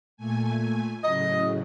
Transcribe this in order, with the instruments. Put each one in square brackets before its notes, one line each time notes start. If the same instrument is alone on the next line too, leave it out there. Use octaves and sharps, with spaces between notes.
[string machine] A#2 A3 G#5
[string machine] A2 C#3 F#3 [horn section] D#5